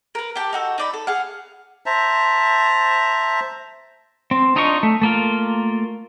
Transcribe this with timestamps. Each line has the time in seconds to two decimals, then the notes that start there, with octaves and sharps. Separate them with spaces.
0.15 A#4 B4
0.35 G4 G5 A5
0.53 D#4 F#4 A4
0.78 D#4 D5 B5
0.94 A4
1.07 G#4 F5 F#5
1.86 C5 E5 A5 A#5
4.31 C4
4.56 D4 D#4 F4 D#5 C#6
4.83 A3
5.02 A3 A#3 F4